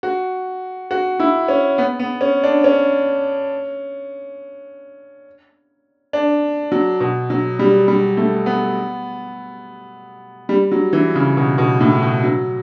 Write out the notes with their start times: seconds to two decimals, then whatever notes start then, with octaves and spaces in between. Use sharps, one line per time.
0.03 F#4
0.91 F#4
1.20 E4
1.48 C#4
1.78 B3
1.99 B3
2.21 C#4
2.43 D4
2.64 C#4
6.13 D4
6.72 F#3
7.00 B2
7.30 F#3
7.59 G3
7.88 G3
8.17 A3
8.46 B3
10.49 G3
10.71 F#3
10.93 E3
11.15 C#3
11.37 B2
11.58 B2
11.80 A2
12.02 B2
12.24 F#3